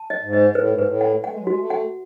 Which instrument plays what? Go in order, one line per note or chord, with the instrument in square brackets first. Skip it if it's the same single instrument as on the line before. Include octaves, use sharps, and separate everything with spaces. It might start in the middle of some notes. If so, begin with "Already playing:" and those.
Already playing: [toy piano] A5
D#5
[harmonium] G#2
[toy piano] D#5
[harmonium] A2 [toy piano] B4
[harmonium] G#2
[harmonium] A2 [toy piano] B4
[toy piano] F#5
[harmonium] A3 [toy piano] F#5
[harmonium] G#3
F#3
[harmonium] G#3 [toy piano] F#4
[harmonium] A3
[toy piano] F#5